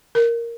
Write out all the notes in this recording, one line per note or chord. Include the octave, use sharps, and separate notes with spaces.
A#4